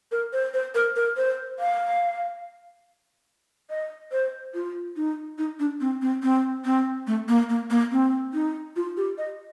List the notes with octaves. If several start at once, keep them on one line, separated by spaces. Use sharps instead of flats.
A#4
C5
C5
A#4
A#4
C5
F5
D#5
C5
F4
D#4
D#4
D4
C4
C4
C4
C4
A3
A#3
A#3
A#3
C4
D#4
F4
G4
D#5